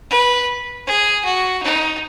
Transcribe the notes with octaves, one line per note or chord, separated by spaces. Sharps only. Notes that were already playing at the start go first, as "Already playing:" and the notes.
B4
G#4
F#4
D#4